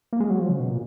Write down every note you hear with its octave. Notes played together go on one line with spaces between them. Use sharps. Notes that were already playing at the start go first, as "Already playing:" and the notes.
A#3
G#3
F#3
F3
C#3
B2
A#2